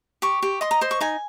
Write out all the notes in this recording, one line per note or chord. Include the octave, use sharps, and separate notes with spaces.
G4 C#6
G4
D#5 C6
A#5
C5 C6
C#6
D#4 G#5